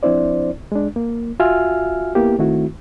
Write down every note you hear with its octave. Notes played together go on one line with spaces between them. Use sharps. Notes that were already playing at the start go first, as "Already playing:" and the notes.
F3 C4 D4 E4 C5 D5
G#3 D4
A#3
F4 F#4 E5 G#5 F6
A#3 B3 E4 G4
D#3 A3 C4 E4 F#4